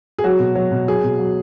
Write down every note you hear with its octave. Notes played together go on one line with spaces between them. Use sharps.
G#4
F#3 F#4
B2
F#3
B2
F#3 G#4
B2
F#3